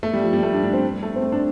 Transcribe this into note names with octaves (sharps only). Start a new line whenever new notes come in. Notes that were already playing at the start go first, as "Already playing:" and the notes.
A3
G3
F3
G3
A3
D4
D4
C4
A3
C4
A3
D4